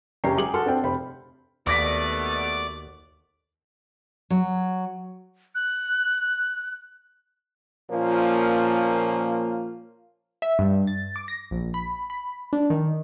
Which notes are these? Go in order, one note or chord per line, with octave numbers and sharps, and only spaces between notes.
F#1 C#4 G4 G5 A#5 C7
F#3 G#4 D6 F#7
F#4 A4 C6 F6
C4 D4 D5 G5
F1 C5 B5
D#2 B2 A3 B3 D5 D6 A#6 B6
F#3
F#6
A#2 F3 A#3 C#4 F4
E5
G2
A6
D6
A#6
A#1
B5
B5
D4
D#3